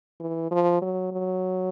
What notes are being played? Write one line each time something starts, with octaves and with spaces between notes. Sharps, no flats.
E3
F3
F#3
F#3